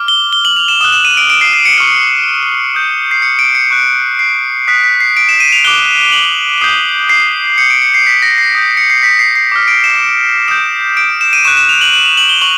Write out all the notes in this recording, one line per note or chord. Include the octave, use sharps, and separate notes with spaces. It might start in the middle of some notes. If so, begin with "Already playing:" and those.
Already playing: D6 F6
G7
G7
F#7
F7
E7
D#6 F#6 E7
E7
D#7
D7
D7
C7
C7
C#7
C#6 F6 D7
D#6 G6
C7
C#7
D7
C#7
C#6 F#6
C7
D#6 F#6 B6
B6
C7
D7
E7
D#7
F7
D6 F#6 G7
F#7
D#6 G6 C7
C7
D#6 G6 C#7
D7
C#7
C7
B6
A#6
C7
D#6 G6
C#7
C7
B6
C7
C7
D6 F6
D7
E7
D#6 G6 E7
D7
E7
D#7
C#6 F#6 E7
E7
F7
F#7
F#7
F7
F#7
G7
C#6 F#7